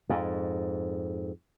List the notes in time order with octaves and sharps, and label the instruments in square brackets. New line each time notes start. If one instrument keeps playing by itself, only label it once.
[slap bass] F2 G#2